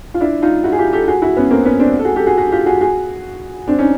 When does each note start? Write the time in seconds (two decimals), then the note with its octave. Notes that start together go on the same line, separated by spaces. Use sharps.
0.14 F4
0.20 D4 E4
0.42 D#4 F4
0.64 E4 F#4
0.72 G#4
0.78 F4 G4
0.93 G4 A4
1.08 F#4 G#4
1.22 E4 F#4
1.36 B3 C#4
1.51 A#3 C4
1.65 B3 C#4
1.79 C4 D4
1.99 A4
2.05 F#4 G#4
2.16 G4 A4
2.27 F#4 G#4
2.37 F#4 G#4
2.52 F4 G4
2.66 F#4 G#4
2.81 F#4 G#4
3.68 C4 D4
3.79 C#4 D#4